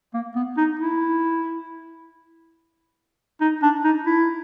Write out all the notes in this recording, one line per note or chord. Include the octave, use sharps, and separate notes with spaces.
A#3
B3
D#4
E4
D#4
D4
D#4
E4